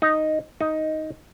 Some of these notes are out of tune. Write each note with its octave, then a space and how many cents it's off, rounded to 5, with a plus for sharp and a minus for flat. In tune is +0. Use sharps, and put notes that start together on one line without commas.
D#4 +0
D#4 +10